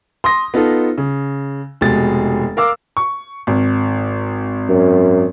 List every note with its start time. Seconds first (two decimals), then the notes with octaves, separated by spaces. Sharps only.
0.24 C6 D#6 A#6
0.54 B3 D#4 F4 A4
0.98 C#3
1.81 F1 B2 G#3 A6
2.57 A#4 F5 D6 E6
2.97 C#6
3.47 G#1
4.69 F#2